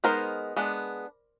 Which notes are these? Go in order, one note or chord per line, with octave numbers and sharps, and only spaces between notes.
G#3 B3 D#4 A#4 C5
G#3 B3 D4